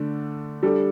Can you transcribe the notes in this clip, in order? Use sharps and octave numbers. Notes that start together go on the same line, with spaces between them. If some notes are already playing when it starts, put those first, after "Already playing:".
Already playing: D3 A3 D4
G3 D4 A4